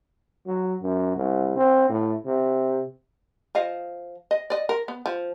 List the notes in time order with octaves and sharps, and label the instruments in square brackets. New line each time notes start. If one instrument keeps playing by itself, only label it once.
[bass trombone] F#3
F#2
C2
C4
A2
C3
[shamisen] F3 D#5 F5
D#5
D5 D#5
A#4
B3
F3